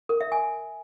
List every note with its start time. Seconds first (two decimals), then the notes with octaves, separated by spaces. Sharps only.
0.09 A#4
0.21 E5
0.32 G#5